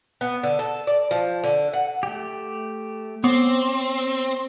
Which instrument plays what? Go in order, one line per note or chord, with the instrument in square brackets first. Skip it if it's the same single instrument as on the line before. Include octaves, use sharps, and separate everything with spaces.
[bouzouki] B3
D3
A4
D5
F3
D3
F#5
[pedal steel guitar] A3 G4
[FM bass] B3 [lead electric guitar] C4 [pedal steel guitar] C#5 D6